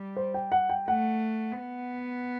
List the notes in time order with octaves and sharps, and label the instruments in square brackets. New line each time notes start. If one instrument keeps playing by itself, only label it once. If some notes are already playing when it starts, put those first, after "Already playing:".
Already playing: [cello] G3
[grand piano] C5
G5
F#5
G5
[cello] A3 [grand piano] F#5
[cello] B3